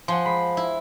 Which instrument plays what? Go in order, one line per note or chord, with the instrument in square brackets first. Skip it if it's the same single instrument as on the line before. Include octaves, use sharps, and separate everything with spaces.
[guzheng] F3 [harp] F#5 G#5 C6
[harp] G#3 B5 C7
[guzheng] E4